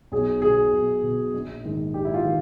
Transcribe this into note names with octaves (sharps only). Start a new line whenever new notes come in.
B1 G#4
B2 G#4
B1
B2
A#1
G#2 D#3
A#1 G4
E4
F4
D#3